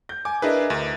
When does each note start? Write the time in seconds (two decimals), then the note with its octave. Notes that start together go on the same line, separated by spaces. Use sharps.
0.09 G6
0.25 G#5 D6
0.42 D4 E4 G#4 A#4 B4 D#5
0.70 D2